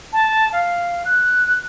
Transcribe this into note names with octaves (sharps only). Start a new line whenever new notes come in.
A5
F5
F#6